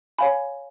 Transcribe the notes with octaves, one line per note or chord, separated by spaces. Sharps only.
C#5 F5 G#5 B5